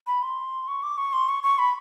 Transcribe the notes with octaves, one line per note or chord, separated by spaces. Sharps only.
B5
C6
C#6
D6
C#6
C6
C#6
C#6
B5